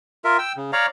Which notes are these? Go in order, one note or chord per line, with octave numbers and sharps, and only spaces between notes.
F4 A#4 E5
G5 E6
C#3
C#5 D5 F5 A#5